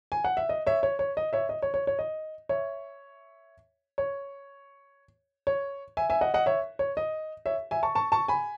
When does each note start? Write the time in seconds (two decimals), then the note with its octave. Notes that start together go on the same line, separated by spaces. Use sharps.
0.12 G#5
0.24 F#5
0.37 E5
0.49 D#5
0.67 C#5 E5
0.83 C#5
0.99 C#5
1.17 D#5
1.33 C#5 E5
1.49 D#5
1.62 C#5
1.74 C#5
1.87 C#5
1.99 D#5
2.49 C#5 E5
3.98 C#5
5.47 C#5
5.97 E5 G#5
6.10 E5 G#5
6.21 D#5 F#5
6.34 D#5 F#5
6.46 C#5 E5
6.79 C#5
6.97 D#5
7.46 C#5 E5
7.71 E5 G#5
7.83 A5 C#6
7.95 A5 C#6
8.12 A5 C#6
8.28 G#5 B5